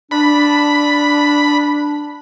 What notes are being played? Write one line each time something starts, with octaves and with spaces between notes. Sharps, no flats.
D4 B5